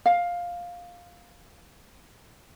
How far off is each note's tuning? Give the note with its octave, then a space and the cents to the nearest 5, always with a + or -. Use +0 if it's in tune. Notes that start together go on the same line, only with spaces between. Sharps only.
F5 +10